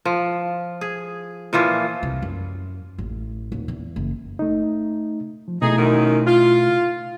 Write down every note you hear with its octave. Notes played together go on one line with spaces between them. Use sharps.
F3
G#4
A#2 E3 F3 F4
C2
F#2
A1
D#1
E2
F#1
A3 D#4
F3
B2 A3 D#4 E4 G#4
F#2 D#3
F4